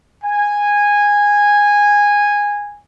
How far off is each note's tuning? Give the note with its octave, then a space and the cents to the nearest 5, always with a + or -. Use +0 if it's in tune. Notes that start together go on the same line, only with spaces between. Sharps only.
G#5 -15